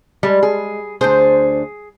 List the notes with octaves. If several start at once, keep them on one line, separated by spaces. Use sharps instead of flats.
G3 G#3
G#4
D2 D4 G#4 C5